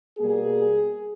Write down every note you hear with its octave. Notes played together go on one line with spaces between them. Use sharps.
B2 G3 A#3 G#4